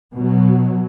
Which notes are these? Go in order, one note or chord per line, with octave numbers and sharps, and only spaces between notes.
B2 F#3